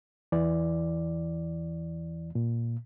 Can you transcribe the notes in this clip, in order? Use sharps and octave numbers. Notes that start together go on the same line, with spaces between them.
E2 E3 D5
A#2